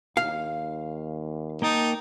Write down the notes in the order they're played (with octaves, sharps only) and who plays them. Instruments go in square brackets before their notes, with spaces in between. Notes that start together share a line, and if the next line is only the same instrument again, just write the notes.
[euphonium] D#2 [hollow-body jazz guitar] F5
[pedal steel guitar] A#3 G5 A5 [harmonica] D#4